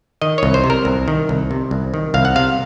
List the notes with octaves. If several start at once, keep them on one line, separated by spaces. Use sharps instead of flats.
D#3 D#5
C2 C#5
C5
C3
A#4
C2
D#3
C2
C3
C2
D#3
C2 F5
F#5
C3 F5